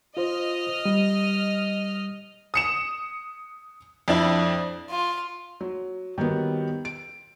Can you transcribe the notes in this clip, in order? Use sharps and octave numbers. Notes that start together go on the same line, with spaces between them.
F4 C5 D#5 F6
G3
D#6 C#7 E7
F2 D4 E4
F4
F#3
D#3 F#3 G3 B3
D7